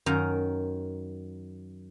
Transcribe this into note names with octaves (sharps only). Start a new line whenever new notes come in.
F#2 D#3 A#4 A#5